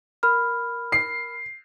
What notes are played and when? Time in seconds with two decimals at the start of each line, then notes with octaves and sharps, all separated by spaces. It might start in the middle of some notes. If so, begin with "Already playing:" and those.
0.23 A#4 B5 F6
0.92 C7